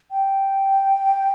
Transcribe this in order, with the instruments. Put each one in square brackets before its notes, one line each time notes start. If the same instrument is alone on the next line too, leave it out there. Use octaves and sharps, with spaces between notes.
[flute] G5